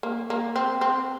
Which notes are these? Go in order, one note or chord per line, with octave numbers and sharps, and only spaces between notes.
A#3
A#3
C4
C4